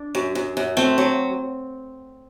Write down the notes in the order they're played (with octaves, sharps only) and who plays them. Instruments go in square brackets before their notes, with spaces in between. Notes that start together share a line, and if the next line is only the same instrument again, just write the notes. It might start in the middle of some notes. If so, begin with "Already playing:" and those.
Already playing: [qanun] D4
[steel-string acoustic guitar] F#2
F#2
F#2
[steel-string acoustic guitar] A3 [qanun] C4
[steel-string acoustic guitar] F#3